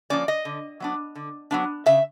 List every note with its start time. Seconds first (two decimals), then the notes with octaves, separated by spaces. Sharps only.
0.10 F3 A#3 C#4 D5
0.28 D#5
0.45 D3
0.80 F#3 B3 D4
1.15 D3
1.51 F#3 B3 D4
1.86 C#3 E5